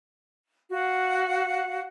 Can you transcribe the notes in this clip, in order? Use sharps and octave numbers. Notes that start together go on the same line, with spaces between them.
F#4 F5 F#5